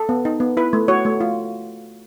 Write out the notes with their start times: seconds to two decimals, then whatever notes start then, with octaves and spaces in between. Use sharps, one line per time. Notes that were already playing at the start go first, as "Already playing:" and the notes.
Already playing: A4
0.09 B3
0.25 D#4
0.40 B3
0.57 E4 B4
0.73 A3
0.88 F#4 C#5
1.05 A3
1.20 F4